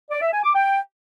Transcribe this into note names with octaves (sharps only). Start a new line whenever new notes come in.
D5
E5
G#5
D6
G5